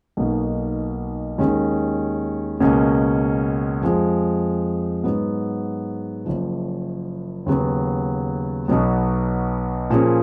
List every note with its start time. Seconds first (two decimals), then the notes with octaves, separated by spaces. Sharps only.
0.17 B1 B2 A#3 D#4
1.38 D#2 D#3 G#3 C#4
2.60 C#2 B2 A#3 C#4
3.82 F2 F3 G#3
5.04 G#2 F#3 B3
6.25 F#1 F#2 F3
7.46 D#2 C#3 F#3 B3
8.68 B1 B2 F#3 B3
9.90 A#2 F3 A#3 C#4 G#4